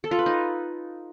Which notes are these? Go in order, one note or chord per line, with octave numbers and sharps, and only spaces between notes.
A4
F4
B4
D#4